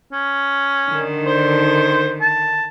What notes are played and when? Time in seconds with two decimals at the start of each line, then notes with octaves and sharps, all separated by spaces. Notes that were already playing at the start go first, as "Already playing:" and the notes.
0.12 C#4
0.88 D3 D#3
1.27 C5
2.21 A5